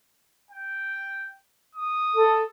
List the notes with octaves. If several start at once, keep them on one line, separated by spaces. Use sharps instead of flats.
G5
D#6
A4